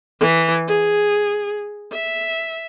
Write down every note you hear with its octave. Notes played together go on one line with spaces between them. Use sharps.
E3
G#4
E5